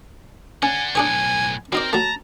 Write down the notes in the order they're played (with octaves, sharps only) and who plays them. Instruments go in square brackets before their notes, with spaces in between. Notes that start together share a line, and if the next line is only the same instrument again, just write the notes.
[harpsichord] C#4 [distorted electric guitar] D5 F#5 [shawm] G#5
[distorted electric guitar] B1 A2 [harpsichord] D4 G#4 C#5 [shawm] G#5
[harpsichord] F#3 D#4 D5 [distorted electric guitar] C4 [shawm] A#4
[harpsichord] F#3 A3 [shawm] A5 [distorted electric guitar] A#5